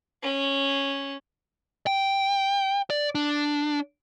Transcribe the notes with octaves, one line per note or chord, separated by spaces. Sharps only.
C#4
G5
D5
D4